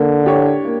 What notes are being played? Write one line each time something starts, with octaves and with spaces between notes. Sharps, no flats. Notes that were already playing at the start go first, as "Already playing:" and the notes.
Already playing: D3 A#3
D4 G4 C#5
A#3